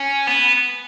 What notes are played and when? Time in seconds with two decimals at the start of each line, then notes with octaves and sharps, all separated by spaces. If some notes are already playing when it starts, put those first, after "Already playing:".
Already playing: C#4
0.27 B3